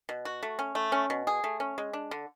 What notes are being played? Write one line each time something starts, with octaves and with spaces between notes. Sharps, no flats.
B2
F#4
A3
C#4
A3
C#4
B2
G#4
A3
C#4
G#3
D4
D3